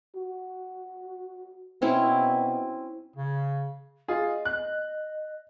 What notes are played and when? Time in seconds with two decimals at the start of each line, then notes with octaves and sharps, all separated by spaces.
0.16 F#4
1.82 B2 C4 C#4 E4
3.16 C#3
4.08 F4 G#4 D#5
4.45 F#6